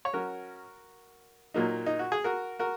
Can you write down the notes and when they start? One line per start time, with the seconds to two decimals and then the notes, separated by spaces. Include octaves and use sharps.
0.05 C#5
0.13 F#3 C#4 F#4 A#4
1.54 A#2 F#3 A#3 D#4
1.86 D#4
1.99 F#4
2.12 G#4
2.24 F#4 A#4
2.59 F#4 A#4